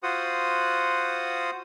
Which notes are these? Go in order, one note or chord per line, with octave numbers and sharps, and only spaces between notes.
F4 F#4 C5 F#5 D#6